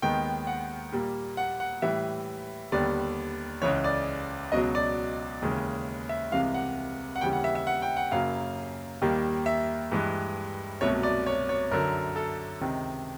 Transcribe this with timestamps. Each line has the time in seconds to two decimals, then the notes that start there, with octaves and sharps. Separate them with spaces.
0.02 D#2 D#3 G#3 B3 G5
0.47 F#5
0.92 A#2 G3 A#3
1.37 F#5
1.60 F#5
1.82 A2 E3 G3 E5
2.72 D#2 D3 G3 B3 D5
3.62 C#2 C#3 E3 C#5
3.84 D5
4.52 C#2 B2 F#3 D#5
4.75 D5
5.42 D#2 C#3 E3 G#3
6.09 E5
6.32 C2 C3 E3 G#3 F5
6.54 F#5
7.16 F#5
7.21 D#2 C#3 E3 G3 G5
7.33 F#5
7.44 E5
7.55 E5
7.67 F#5
7.82 G5
7.97 F#5
8.11 F#2 C#3 F#3 A#3 F5
9.02 D#2 D#3 G3 A#3
9.46 E5
9.92 G2 E3 G#3
10.81 C2 B2 F#3 A3 C#5
11.03 D5
11.26 C#5
11.49 C#5
11.71 F#2 D3 F#3 A#4
12.16 A4
12.61 C#2 C3 D#3